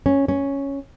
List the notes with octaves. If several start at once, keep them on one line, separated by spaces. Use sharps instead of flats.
C#4
C#4